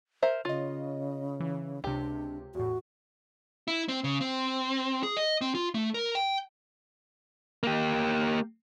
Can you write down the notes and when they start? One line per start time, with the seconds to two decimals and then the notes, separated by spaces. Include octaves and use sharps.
0.22 A#4 C5 E5
0.45 C#3 F4 C#5 D#5
1.40 E3
1.84 C#2 C3 D4 G4
2.55 E2 A2 F#4
3.68 E4
3.88 C4
4.04 C#3
4.21 C4
5.03 G#4
5.17 D#5
5.41 C4
5.55 F4
5.75 A3
5.94 A#4
6.15 G5
7.63 A#3 G4